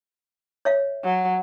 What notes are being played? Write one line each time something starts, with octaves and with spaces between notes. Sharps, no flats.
C#5 E5 F5
F#3